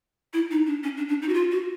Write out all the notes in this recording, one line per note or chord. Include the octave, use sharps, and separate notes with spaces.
E4
D#4
D4
C#4
D4
D4
D#4
F#4
F4
F#4